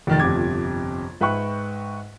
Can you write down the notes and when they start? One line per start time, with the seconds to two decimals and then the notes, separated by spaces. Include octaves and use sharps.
0.07 F1 D#3 A6
0.19 G1 F2 C3 D6 G#6
1.21 G#2 B4 E5 G5 C#6 F#6